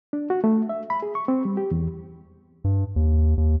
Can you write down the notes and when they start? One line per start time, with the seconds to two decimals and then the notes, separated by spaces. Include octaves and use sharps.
0.13 D4
0.30 F#4
0.44 A3
0.69 E5
0.90 B5
1.02 G#4
1.15 C#6
1.28 C4
1.45 G3
1.57 G4
1.71 E2
2.64 G2
2.96 D#2
3.37 D#2